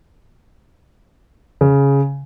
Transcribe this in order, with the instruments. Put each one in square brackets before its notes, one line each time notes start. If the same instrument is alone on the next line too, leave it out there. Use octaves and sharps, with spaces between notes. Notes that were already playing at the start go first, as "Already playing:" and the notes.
[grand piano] C#3